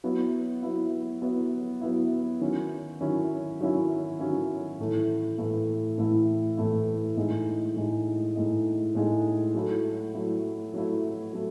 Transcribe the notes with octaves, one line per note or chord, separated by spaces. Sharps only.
F#3 B3 E4
F#3 B3 E4
F#3 B3 E4
F#3 B3 E4
D#3 F#3 C#4 E4
D#3 F#3 C#4 E4
D#3 F#3 C#4 E4
D#3 F#3 C#4 E4
A2 E3 A3 E4
A2 E3 A3 E4
A2 E3 A3 E4
A2 E3 A3 E4
A2 G#3 D#4
A2 G#3 D#4
A2 G#3 D#4
A2 G#3 D#4
F#3 A3 E4
F#3 A3 E4
F#3 A3 E4
F#3 A3